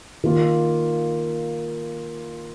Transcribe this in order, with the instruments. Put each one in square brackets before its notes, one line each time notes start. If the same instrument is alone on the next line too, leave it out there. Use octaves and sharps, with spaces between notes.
[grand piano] D#3 A#3 F4